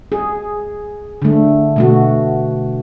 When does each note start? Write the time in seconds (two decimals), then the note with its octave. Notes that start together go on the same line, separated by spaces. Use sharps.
0.12 G#4
1.22 D3 A3
1.76 B2 A3 F#4